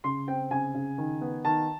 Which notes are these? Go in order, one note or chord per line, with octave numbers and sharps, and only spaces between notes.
C#3 C6
C4 G5
C#3 G#5
C#3
D#3
B3
D#3 A5